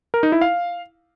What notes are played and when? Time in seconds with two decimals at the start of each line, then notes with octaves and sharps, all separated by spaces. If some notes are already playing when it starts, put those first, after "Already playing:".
0.14 A#4
0.23 D#4
0.32 E4
0.41 F5